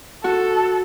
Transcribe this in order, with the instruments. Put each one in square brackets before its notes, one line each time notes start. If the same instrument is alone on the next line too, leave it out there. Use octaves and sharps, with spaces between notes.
[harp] F#4 [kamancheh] A4